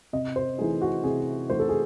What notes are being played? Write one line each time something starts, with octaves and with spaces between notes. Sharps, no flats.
C3 D#5
C5
E3 A3 D#4 G#4
F#4
C3 G#4
E3 A3 D#4 C5
A4
G#4